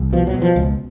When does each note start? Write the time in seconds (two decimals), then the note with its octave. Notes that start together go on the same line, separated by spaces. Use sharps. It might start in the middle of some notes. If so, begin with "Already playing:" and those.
Already playing: C2
0.13 B2 F3
0.27 F#3
0.34 B2
0.42 F3
0.56 C#2